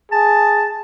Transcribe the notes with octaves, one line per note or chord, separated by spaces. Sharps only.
G#4 A5